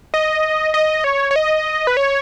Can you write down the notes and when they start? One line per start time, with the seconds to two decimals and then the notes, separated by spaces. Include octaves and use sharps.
0.14 D#5
0.74 D#5
1.04 C#5
1.31 C#5
1.36 D#5
1.87 B4
1.97 C#5